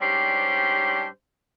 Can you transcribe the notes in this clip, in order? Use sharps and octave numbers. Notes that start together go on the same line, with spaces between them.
G#2 G3 C#4 D4 G4 C5